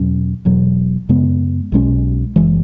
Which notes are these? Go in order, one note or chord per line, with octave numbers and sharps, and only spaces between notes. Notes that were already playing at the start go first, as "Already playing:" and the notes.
Already playing: E2 B2 F#3 C#4
E1 E2 B2 F#3
F#2 C#3 G#3 B3
B1 B2 G#3 C#4
F#1 F#2 E3 G#3